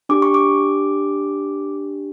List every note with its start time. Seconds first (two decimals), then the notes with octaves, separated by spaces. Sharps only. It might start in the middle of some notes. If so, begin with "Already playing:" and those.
0.09 D4 G4 D6
0.22 C#6
0.34 D6